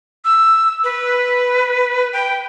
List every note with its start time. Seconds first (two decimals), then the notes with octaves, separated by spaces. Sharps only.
0.25 E6
0.84 B4
2.13 G5